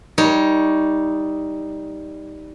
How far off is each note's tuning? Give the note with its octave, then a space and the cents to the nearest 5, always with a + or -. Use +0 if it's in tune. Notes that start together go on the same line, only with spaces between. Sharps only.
G3 +0 D#4 +10 C#5 +0